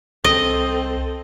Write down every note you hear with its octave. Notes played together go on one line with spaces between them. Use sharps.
C2 C4 A4 D#5